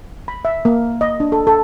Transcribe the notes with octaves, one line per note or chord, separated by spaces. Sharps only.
B5
E5
A#3
D#5
D4
A4
A4